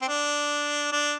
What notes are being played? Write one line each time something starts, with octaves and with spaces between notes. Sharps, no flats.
C4
D4
D4